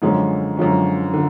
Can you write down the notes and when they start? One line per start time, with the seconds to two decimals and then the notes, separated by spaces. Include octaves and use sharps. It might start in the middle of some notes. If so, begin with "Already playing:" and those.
0.02 F#2 D3 F3 G#3 C#4
0.57 F#2 D3 F3 G#3 C#4
1.14 D3